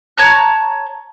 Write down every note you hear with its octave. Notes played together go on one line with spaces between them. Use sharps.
C#5 A5 A#5 F#6